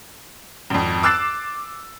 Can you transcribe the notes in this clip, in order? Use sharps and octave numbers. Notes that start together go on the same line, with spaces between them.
G#1 F2
D6 E6 F#6 A6 C7 E7